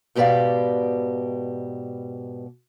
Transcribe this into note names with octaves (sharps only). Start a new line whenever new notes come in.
G#2 B2 G4 B4 D5 F5